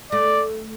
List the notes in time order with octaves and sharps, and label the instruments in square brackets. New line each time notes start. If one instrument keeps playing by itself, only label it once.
[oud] A3 [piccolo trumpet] D5